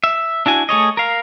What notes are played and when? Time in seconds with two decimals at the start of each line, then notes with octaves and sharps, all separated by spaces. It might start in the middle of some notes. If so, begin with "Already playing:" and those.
0.04 E5
0.46 D4 E4 F#4 G#5
0.69 A3 G#4 C#5 D#5
0.97 A#4 F5